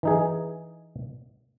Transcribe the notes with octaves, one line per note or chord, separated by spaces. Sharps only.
E3 D#4 G#4